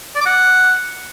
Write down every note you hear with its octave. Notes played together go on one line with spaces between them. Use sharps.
D5
D6
F#5